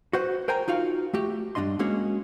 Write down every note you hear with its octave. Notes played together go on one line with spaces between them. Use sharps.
F#4 B4 C5 F#5
A#4 C5 G5 G#5 A#5
D#4 F4 F#4 F5
A3 F#4 G4
G2 E3 D4 D#5 C6
G#3 A#3 C#4 F#4 G#4 C#5